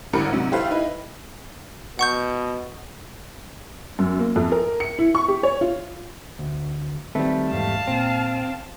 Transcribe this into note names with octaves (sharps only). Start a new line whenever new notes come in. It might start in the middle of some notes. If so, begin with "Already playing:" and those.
G#1 A2 D3 G3 A#4 C#7
G#2 C3 F#3
E4 G4 A4 B4 C5 F5
D#4 E4 B4
B2 F#5 C#6 G6
F#2
A#3
F2
A#4
C#7
E4
C#6
G4
C#5
F4
D2
D#3 G3 A3 C4 B4
E2 G#2 F5 A5
A#2 C4